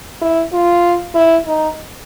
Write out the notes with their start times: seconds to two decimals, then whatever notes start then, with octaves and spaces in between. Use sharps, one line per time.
0.22 E4
0.53 F4
1.15 E4
1.46 D#4